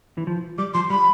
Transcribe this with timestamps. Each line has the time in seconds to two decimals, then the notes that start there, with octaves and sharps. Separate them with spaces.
0.17 E3
0.27 F3
0.58 G3 D6
0.74 F3 C6
0.90 G3 B5